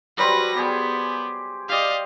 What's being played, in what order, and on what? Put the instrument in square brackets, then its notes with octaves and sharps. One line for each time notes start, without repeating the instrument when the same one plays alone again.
[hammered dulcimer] F#3 G3 C5 [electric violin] B4 A#6
[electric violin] B3 [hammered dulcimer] G4 G#4 G#5
[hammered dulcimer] G4 D5 [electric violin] D#5 F5